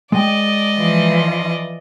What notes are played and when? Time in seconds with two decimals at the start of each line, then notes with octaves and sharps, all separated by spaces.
0.12 G#3 D5 D#5 G5
0.77 E3 F3